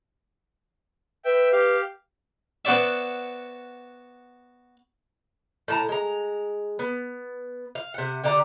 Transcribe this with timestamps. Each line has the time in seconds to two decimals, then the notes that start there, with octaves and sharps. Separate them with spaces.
1.25 B4 E5 G5
1.52 G4 F5
2.65 B3 F#4 C5 D5 E5
5.68 A2 A5 A#5
5.89 G#3 A#5
6.79 B3
7.75 F5
7.94 C3 F#5
8.24 D3 G4 D5 A#5